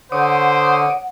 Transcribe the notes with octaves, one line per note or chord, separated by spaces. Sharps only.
D3 C5 C#5 F#5 D6 D#6